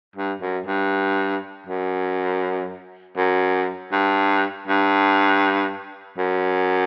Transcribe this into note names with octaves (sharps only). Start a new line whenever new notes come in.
G2
F#2
G2
F#2
F#2
G2
G2
F#2